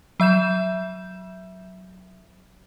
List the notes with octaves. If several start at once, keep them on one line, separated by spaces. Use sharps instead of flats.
F#3 E5 G6 E7